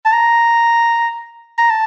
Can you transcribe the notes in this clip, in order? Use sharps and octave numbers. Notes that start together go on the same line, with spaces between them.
A5
A#5
A#5
A5